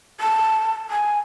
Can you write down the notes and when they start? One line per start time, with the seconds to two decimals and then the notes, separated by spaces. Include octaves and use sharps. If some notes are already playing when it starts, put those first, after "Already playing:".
0.20 A5
0.91 G#5